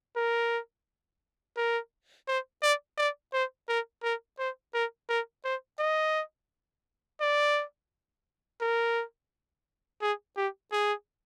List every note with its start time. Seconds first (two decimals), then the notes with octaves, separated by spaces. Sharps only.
0.16 A#4
1.57 A#4
2.28 C5
2.62 D5
2.98 D5
3.33 C5
3.69 A#4
4.03 A#4
4.39 C5
4.74 A#4
5.09 A#4
5.45 C5
5.79 D#5
7.21 D5
8.61 A#4
10.02 G#4
10.37 G4
10.72 G#4